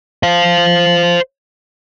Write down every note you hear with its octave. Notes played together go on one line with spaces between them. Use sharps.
C5 F5